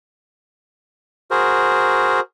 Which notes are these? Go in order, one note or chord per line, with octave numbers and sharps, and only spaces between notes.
F#4 G#4 A#4 C5